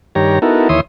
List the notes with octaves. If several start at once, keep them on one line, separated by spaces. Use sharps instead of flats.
G2 D#3 G4 C#5 A#5
B3 D#4 E4 F#4 A4 A#4
D#2 E3 C#5 E5 C6 D#6